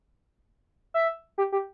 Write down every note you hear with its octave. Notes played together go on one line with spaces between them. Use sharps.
E5
G4
G4